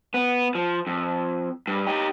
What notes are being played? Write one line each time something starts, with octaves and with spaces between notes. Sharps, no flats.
B3
F3
F2
G2
D#4 G4